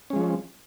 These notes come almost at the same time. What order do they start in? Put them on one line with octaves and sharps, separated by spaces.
C#4 G#3 F3